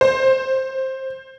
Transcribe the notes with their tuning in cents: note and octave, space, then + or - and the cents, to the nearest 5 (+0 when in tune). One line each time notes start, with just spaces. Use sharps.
C5 +15